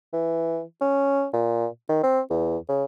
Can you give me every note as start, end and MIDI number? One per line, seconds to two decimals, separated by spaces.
0.13 0.63 52
0.81 1.27 61
1.33 1.67 46
1.89 1.99 51
2.03 2.20 60
2.30 2.57 40
2.69 2.85 49